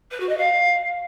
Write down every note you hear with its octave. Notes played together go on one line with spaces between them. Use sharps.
B4
F#4
D#5
F5